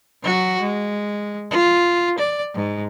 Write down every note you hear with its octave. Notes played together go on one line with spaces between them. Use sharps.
F#3 F#4
G#3
F4
D5
G#2